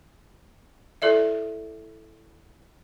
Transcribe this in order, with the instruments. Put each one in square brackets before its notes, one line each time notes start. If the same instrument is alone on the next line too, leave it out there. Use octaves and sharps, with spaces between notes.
[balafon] E4 A4 D5 E5